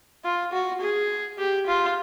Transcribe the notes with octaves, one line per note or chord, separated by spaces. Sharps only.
F4
F#4
G#4
G4
F4